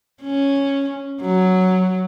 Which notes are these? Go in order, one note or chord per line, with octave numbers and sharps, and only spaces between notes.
C#4
F#3